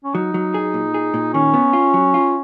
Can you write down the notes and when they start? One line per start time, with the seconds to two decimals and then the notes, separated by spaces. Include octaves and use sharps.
0.04 C#4
0.14 F#3 D#4
0.34 F#3
0.54 G#4
0.74 A#2
0.94 G#4
1.14 A#2
1.34 D#3 C#4
1.54 B3
1.73 F4
1.94 F#3
2.14 F4